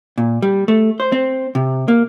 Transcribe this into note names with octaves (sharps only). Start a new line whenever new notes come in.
A#2
G3
A3
C5
C4
C3
A#3